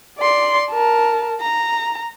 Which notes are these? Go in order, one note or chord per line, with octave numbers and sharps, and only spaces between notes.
D5 C6
A#4 A5
A#5